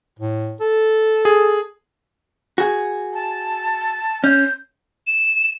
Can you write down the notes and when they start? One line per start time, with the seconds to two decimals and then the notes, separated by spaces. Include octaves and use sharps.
0.19 A2
0.60 A4
1.25 G#4
2.58 F#4 G#4
3.14 A5
4.24 C#4 G6
5.07 E7